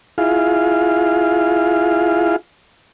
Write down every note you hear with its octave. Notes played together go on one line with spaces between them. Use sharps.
E4 F4 G#4 F5